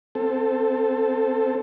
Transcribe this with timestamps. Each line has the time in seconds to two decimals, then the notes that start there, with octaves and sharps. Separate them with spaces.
0.15 C4 A4